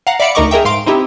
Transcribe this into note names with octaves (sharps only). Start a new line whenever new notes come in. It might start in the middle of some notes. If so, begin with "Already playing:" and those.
F5 F#5 A#5
D5 E5 F5 B5 C#7 D7
D2 D#4 A#4 D#5 C#6 D6
G#4 A#4 E5 G5
G#2 F5 C6 D7
C4 D#4 E4 G4